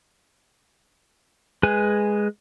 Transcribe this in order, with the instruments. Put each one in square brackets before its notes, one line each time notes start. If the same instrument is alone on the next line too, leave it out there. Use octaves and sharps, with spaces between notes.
[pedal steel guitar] G#3 G#4 B4 G#5